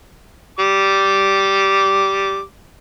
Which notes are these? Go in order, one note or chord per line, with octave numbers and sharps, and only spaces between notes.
G3 D6